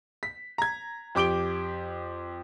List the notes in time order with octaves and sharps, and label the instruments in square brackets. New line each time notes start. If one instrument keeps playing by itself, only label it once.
[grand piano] B6
A#5 G#6
F2 G4 D6 D7 G7